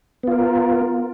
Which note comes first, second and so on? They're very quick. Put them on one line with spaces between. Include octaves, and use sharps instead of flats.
B3 F4 A#4